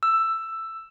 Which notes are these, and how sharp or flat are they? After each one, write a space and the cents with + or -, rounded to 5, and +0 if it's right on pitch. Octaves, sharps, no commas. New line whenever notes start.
E6 +10